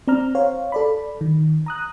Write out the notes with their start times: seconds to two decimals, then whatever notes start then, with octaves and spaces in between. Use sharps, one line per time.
0.08 C4 D5 A#5 F6
0.35 C5 C#5 F5
0.72 A4 D5 B5
1.21 D#3
1.66 A#5 D#6 F#6